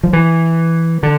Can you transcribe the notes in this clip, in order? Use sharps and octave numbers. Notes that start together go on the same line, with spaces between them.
F3
E3
D3